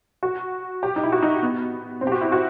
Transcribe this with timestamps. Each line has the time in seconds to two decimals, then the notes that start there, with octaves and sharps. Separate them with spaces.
0.23 F#4
0.83 G4
0.96 D#4
1.03 E4
1.12 F#4
1.22 D#4
1.43 B3
2.01 C4
2.07 G4
2.12 F#4
2.21 E4
2.32 F#4